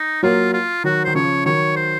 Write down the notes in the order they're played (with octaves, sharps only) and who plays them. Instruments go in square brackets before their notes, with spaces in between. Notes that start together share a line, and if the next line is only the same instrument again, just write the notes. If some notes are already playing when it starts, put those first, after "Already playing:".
Already playing: [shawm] D#4
[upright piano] F#3 A#3 [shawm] F4
[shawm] F4
[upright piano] D#3 F#3 [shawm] F#4
[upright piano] D#3 [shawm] C5
[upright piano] C#3 F3 [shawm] C#5
[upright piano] D#3 F#3 [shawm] C#5
[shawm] C5